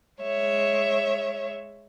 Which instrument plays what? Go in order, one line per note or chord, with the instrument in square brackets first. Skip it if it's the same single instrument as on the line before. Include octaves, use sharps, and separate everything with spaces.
[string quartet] G#3 C#5 E5